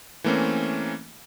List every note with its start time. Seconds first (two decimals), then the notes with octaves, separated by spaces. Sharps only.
0.24 E3 A3 A#3 C4 C#4